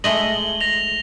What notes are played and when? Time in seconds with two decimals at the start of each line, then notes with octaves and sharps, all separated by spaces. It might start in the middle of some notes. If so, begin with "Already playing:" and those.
0.04 G#3 A3 D#5 F#7 G7
0.61 A#6 F7